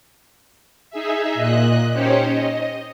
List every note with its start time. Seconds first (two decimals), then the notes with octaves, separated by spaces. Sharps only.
0.90 D#4 G#4 E5
1.35 A#2 D#5 F#6
1.92 C#4 D#4 G4 C5 C#5
2.30 D#5